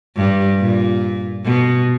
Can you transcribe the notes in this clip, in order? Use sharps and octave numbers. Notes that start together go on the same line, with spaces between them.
G2
A#2
B2